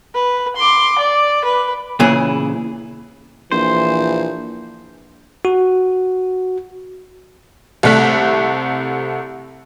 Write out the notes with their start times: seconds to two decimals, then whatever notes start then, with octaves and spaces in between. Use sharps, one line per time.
0.14 B4
0.56 C6 D6
0.99 D5
1.44 B4
2.00 A#2 C#3 E3 E4 G#4
3.52 A#1 E3 C5
5.45 F#4
7.83 C2 C3 A3 F#6 B6